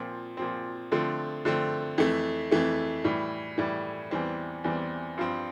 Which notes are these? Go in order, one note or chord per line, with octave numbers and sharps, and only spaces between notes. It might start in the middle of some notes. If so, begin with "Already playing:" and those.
Already playing: A#2 F3 C4
A#2 F3 C4
D3 F3 A3 C4
D3 F3 A3 C4
F2 E3 A3
F2 E3 A3
A2 E3 G3
A2 E3 G3
E2 E3 G3 C4
E2 E3 G3 C4
G2 F3 C4